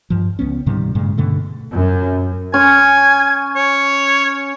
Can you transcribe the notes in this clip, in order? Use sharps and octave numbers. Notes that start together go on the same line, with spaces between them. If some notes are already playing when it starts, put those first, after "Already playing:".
G2 F3
C#2 B3 C#4
G#2 C3 D#3 G3
G2 A#2 C#3 G#3
G2 B2 D3 A3
F#2
C#4 G#5
C#5